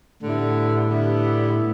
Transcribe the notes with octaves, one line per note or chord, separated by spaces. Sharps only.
A2 D3 G3 B3 E4
D3 G3 B3 E4